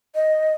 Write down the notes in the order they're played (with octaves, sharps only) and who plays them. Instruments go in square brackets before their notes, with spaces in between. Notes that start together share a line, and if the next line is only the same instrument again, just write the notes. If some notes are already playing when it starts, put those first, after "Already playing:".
[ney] D#5